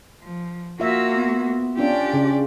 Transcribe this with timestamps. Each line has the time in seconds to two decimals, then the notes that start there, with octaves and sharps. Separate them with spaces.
0.22 F3
0.80 A#3 F4 F#4 E5
1.14 B3
1.77 C#4 D4 F4 G4 D5
2.13 C#3 C#4